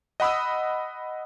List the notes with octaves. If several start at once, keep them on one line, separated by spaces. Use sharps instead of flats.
D#5 F#5 B5 D#6 E6